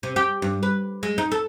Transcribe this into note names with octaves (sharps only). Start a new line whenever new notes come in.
C3
G4
G2
B4
G#3
D#4
A4